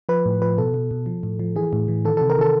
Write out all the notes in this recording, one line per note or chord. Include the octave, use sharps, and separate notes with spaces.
F3 B4
A2
F3 B4
B2 A4
B2
B2
F3
A2
F3
E3 G#4
A2
E3
D#3 A4
C3 A4
A#4
D#3 A4